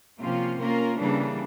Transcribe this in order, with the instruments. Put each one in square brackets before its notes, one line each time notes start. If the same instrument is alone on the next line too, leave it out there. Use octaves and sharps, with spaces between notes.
[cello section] C3 F3 A#3 C#4 F4
A#3 C#4 F4 A#4
C#3 E3 G3 A#3 D4